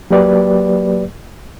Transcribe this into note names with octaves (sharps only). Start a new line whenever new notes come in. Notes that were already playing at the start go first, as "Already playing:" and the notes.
F#3 A#3 G4 B4 D5